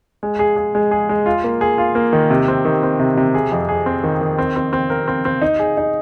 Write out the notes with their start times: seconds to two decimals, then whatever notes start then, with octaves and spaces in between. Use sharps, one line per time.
0.23 G#3
0.39 G#4
0.56 G#4
0.75 G#3
0.91 G#4
1.09 G#3
1.26 F4
1.44 A#3
1.61 G#4
1.78 F4
1.95 A#3
2.13 D#3
2.30 C3
2.48 C4
2.65 D#3
2.83 C4
2.99 C3
3.17 C3
3.35 G#4
3.52 F2
3.69 G#4
3.86 C4
4.04 D#3
4.21 D#3
4.38 C4
4.56 C4
4.73 C4
4.90 A#4
5.08 C4
5.25 C4
5.41 D#4
5.59 G#4
5.77 D#4